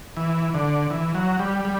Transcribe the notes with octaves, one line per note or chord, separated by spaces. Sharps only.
E3
D3
E3
F#3
G3
G3